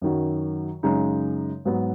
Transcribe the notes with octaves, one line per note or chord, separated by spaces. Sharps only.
F#2 D#3 F#3
F#2 C#3 G#3 D#4
G#2 F#3 B3